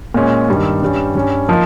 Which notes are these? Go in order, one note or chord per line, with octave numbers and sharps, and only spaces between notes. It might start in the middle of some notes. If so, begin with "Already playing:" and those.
A#2 G#3 C#4
G2 D#3 G3
G2 G3 C#4
G2 G3 C#4
F3 A#3 D#4